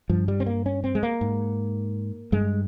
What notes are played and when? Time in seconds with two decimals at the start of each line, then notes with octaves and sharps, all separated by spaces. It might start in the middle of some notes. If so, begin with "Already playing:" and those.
0.10 G2 F3
0.28 G3
0.40 C4
0.46 A#3
0.66 C#4
0.84 C4
0.95 G#3
1.03 A#3
1.21 G#2
2.32 G2 G#3